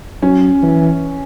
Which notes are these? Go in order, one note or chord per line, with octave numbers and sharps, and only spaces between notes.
F#3 C#4
E3